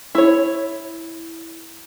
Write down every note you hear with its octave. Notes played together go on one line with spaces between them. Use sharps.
E4 C#5